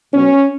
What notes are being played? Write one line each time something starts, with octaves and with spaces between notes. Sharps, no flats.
B2 F#3 B3 C#4